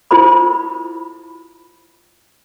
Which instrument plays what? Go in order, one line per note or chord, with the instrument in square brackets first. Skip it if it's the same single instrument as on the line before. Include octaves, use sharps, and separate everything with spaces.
[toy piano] E4 F4 A#4 C5 B5